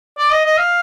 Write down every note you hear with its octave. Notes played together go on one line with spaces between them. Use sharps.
D5
D#5
D#5
F5